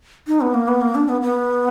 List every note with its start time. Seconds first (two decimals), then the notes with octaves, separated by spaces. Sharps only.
0.28 D#4
0.41 B3
0.54 A#3
0.68 B3
0.81 A#3
0.95 D4
1.09 B3
1.22 B3